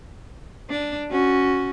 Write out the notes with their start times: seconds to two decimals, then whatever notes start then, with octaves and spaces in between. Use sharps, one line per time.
0.70 D4
1.11 C#4 F#4